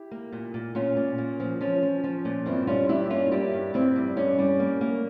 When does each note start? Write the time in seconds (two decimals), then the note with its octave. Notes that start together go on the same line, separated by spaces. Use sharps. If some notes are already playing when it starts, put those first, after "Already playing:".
Already playing: E4 G4
0.11 A#3
0.32 A#2
0.54 A#2
0.75 A#2 C#4 F4
0.97 A#2
1.18 A#3
1.40 F3
1.61 F3 C#4
1.82 F3
2.04 F3
2.25 A#2
2.46 G2 C4 E4
2.67 G3 C#4 F4
2.89 G2 E4 G4
3.10 A#3 C#4 F4
3.32 G3 E4 G4
3.53 G2
3.74 G2 C4 E4
3.96 G3
4.17 G2 C#4
4.39 G3
4.60 A#3
4.81 A#3